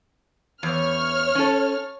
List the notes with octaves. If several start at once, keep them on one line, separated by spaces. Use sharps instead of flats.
E2 C#5 F6
C#4 A4